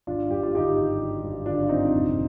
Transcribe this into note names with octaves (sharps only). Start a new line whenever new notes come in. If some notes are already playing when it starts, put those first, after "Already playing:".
G#1 D4 F4
G2 G4
F4
D3 D#4 G4
G#1
G#1
G2
D3 D4 F4
F4
G#1 C4 D#4
F1